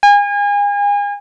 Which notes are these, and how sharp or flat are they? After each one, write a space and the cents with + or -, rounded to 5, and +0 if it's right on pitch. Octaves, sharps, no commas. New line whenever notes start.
G#5 -35